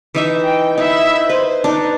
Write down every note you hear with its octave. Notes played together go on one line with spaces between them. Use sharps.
E3 D#4 E5
G5
D#4 E4 E5
B4 C5
D4 D#4 B4